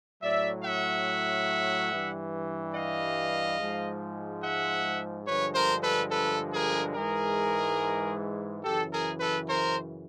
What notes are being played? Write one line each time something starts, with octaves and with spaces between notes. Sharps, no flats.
A2 F#3 D5 E5
E5 F#5
G2 E3 G3
D#5 F5
G#2 F3 G#3
E5 F#5
G2 D3 F3 G#3 B4 C#5
A#4 C5
A4 B4
A4 B4
G#4 A#4
G#2 E3 G#3 G#4 A#4
F#2 C#3 E3 G4 A4
G#4 A#4
A4 B4
A#4 C5